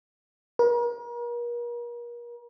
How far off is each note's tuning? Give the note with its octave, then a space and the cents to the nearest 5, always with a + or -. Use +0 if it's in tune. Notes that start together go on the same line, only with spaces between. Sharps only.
A#4 +40